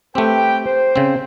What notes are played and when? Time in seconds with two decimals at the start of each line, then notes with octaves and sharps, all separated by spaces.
0.15 A3 C4 G4 B4 G5
0.65 C5
0.96 C#3 C4